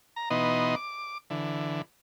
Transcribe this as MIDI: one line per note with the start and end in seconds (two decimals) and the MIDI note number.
0.16 0.29 82
0.30 0.75 47
0.30 0.75 52
0.30 0.75 59
0.30 0.75 63
0.30 0.75 75
0.30 0.75 84
0.76 1.18 86
1.30 1.82 50
1.30 1.82 52